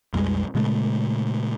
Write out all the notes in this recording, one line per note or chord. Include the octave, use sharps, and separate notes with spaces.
B1 F2 G3 G#3
A#2 C#3 G#3 A3